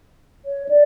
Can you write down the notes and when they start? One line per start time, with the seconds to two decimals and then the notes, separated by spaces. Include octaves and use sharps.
0.45 C#5
0.69 D5